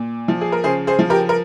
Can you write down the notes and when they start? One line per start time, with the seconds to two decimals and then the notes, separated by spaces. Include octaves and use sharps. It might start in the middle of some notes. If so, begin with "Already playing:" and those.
Already playing: A#2
0.28 F3
0.41 G#4
0.52 A#4
0.64 C#3 G#4 C5
0.87 G#4 C5
0.99 F3
1.10 G4 A#4
1.29 A#4